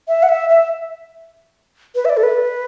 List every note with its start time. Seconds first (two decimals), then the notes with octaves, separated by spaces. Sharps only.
0.08 E5
0.23 F#5
0.29 E5
0.49 E5
1.95 B4
2.05 E5
2.10 D5
2.17 A4
2.23 B4